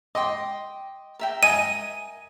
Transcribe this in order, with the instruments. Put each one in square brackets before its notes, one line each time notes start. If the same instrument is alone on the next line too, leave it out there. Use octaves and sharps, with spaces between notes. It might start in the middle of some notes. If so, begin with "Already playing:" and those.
[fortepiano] D#5 [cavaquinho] G5 C6 D6
[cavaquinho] A#4 E5 G5
[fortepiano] D#5 G#5 [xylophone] D#7